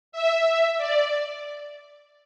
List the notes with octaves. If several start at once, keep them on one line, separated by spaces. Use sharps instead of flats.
E5
D5